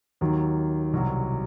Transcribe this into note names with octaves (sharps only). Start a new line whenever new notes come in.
D#2 D#3 F#3
C2 B2 F#3